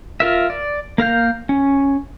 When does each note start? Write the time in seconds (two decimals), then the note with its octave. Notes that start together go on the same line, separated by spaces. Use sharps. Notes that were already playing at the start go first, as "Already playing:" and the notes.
0.20 F4 A#4 E5
0.50 D5
0.98 A#3 A#4 F5 G6
1.49 C#4